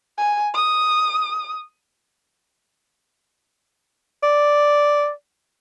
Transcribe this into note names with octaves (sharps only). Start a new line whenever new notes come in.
G#5
D#6
D5